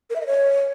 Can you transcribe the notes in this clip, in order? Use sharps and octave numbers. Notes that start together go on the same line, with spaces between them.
A#4
E5
D#5
C#5